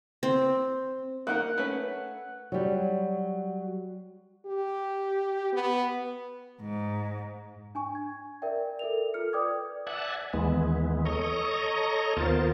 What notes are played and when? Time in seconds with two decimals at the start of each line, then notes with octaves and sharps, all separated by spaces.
0.23 C4
1.27 A#3 D#4 A#4 F#5
1.58 A3 C#4 B4
2.52 F#3 G3
4.46 G4
5.53 B3
6.61 G#2
7.75 D4 G#5 C#6
7.95 G#6
8.42 A#4 D5 E5 G5
8.79 A4 A#4 E5 F7
9.14 F4 A4 F6 C#7
9.33 B4 D5 G5 D6 D#6 G#6
9.87 D5 E5 F#5 G#5 A5
10.33 D#2 E3 G#3 B3
11.05 A4 C#5 D#5 A#5 C#6 D#6
12.17 D#2 B3 F4 A#4 C5 A6